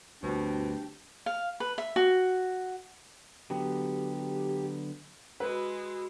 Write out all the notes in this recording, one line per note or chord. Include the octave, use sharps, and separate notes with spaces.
D2 G2 B2 C4 D4 G4 C5
F5
B4
E5
F#4
D3 F#3 B3 G4
G#3 F#4 B4 B5 E6